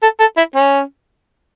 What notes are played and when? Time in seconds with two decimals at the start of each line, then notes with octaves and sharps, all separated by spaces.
0.02 A4
0.20 A4
0.37 E4
0.55 C#4